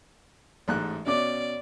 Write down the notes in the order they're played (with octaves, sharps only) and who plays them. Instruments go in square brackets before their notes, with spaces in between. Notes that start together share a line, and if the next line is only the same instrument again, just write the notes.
[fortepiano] A1 G#2 F#6
[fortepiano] B2 C#4 D6 [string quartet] D5